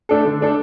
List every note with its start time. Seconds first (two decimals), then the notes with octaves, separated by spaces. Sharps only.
0.09 A3 D4 A4
0.25 D3
0.41 A3 D4 A4